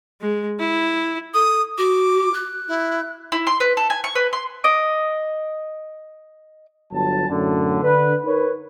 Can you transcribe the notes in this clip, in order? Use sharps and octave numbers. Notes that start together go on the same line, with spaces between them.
G#3
E4
A4 D#6
F#4 D6
F#6
E4
E4
C6
B4
A4
G#5
C#6
B4
C6
D#5 D6
G1 F#3 A5
F#2 A2 D3
D3 B4
D#4 A#4 B4 C#5